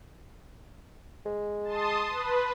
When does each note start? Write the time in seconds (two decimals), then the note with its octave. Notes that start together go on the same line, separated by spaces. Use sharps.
1.26 G#3
1.64 A5 C6 D#6
2.10 B4